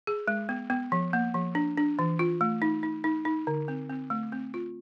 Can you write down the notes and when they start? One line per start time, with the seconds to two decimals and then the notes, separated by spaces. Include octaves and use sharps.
0.07 G#4
0.28 G#3
0.49 B3
0.70 B3
0.92 F3
1.13 A#3
1.34 F3
1.55 D4
1.78 D4
1.99 E3
2.19 F4
2.41 A3
2.62 D#4
2.83 D#4
3.04 D#4
3.25 D#4
3.47 D3
3.68 C4
3.90 C4
4.10 A3
4.32 C4
4.54 F4